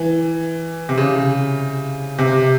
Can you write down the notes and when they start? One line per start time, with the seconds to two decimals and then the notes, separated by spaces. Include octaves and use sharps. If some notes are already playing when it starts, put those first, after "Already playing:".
Already playing: E3
0.89 C3
0.98 C#3
2.18 C3